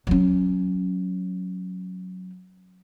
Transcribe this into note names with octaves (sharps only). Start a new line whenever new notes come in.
F#3 C#4